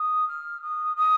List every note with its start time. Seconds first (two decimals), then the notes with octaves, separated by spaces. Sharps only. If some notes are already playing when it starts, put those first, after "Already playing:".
Already playing: D#6
0.28 F6
0.62 D#6
0.96 D#6